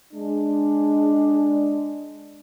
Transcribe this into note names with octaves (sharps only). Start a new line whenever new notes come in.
G#3 D4